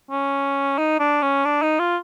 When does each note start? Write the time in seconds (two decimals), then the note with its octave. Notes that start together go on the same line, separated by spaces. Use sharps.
0.11 C#4
0.78 D#4
1.00 D4
1.22 C#4
1.45 D4
1.62 D#4
1.79 F4